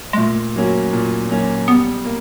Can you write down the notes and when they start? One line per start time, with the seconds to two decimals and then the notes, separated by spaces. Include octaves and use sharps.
0.13 G#3
0.18 A#2 A3
0.56 F#3 A#3 C#4 F#4
0.93 A#2
1.30 F#3 A#3 C#4 F#4
1.68 G3 B3
2.05 A#3